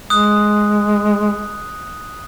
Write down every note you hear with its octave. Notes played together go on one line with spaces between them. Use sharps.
G#3 D#6 F#6